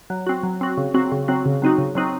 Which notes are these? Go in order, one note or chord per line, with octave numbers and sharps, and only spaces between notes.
F#3
C4 F#4
F#3
C4 F#4
C#3
F#3 C4 F#4
C#3
F#3 C4 F#4
C#3
F#3 C4 D#4 F#4
C#3
F#3 C4 D#4 F#4